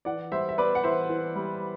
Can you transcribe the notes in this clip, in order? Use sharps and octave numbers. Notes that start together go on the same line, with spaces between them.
E3 D5 F#5
G3 C5 E5
E5
B3 B4 D5
F#5
E3 C5 E5
E3
G3